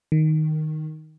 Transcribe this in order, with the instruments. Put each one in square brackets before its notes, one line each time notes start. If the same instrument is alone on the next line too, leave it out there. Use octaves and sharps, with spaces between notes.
[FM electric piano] D#3